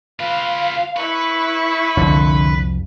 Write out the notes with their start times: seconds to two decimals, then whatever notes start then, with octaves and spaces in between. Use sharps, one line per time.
0.20 F4 B4 F5
0.97 E4 B4 C#6
1.97 C2 F2 D3